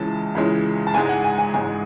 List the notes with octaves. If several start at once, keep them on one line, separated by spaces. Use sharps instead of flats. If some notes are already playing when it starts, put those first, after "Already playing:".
Already playing: C#2 C#3 E3 G#3 A5
C#2 C#3 E3 G#3
A5
A1 G#2 G#3 G#5
F#5
G#5
G#5
A1 G#2 G#3 G#5